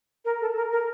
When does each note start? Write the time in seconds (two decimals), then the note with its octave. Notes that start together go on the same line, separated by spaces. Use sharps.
0.25 A#4
0.41 A4
0.56 A#4
0.72 A#4